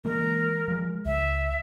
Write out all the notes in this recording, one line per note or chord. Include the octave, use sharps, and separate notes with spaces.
E3 G#3 A#3 A#4
F3 G#3
C#2 E5